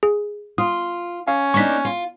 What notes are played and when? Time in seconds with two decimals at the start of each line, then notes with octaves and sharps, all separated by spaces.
0.03 G#4
0.58 F4 D#6
1.28 C#4 F5
1.54 A#3 D4 D#4 C#6 B6
1.85 F4